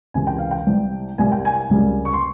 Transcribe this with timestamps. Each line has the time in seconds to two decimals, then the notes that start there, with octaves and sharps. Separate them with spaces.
0.14 C#2 C3 E3 A#3 G#5
0.27 G5
0.39 F5
0.51 G5
0.67 C2 C3 G3
1.18 C2 C3 G3 A#3 G#5
1.32 G5
1.45 G#5
1.70 C#2 C3 G3 A#3
2.05 C#6
2.13 C6